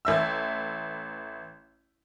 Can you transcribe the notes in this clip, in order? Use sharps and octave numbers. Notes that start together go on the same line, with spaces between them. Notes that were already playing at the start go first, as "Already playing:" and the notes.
A1 E5 E6